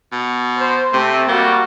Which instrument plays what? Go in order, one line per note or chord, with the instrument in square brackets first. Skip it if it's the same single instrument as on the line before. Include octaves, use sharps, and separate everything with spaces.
[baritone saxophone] B2
[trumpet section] C5
[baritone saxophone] C3 [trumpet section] A3 C4
[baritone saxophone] G3 [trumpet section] A#3 F#4